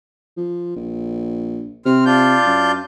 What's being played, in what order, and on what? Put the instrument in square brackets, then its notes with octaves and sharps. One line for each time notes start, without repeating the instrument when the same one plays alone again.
[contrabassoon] F3
A#1
[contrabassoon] C3 [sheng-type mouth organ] C4 F6
[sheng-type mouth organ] D4 F4 G6
[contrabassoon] F#2